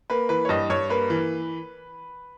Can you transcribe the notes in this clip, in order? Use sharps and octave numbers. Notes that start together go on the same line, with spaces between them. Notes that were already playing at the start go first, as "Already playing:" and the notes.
A#3 B4
E3 B4
C#5
G2 D#5
G2 C#5
A#3 B4
E3